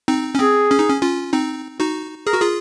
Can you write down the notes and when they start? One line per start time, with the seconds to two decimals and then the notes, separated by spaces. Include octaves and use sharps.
0.08 C4 D#4
0.35 C#4
0.39 C4 G#4
0.71 C#4
0.79 D#4
0.89 C#4
1.02 C#4 F4
1.33 C4 D#4
1.80 D#4 F#4
2.27 G#4 A#4
2.34 F#4
2.41 F4 G#4